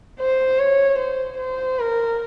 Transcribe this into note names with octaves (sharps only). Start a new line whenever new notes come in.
C5
C#5
C5
C5
A#4